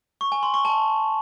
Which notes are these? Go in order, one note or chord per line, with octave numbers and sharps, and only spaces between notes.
C#6
G#5
C6
C#6
A5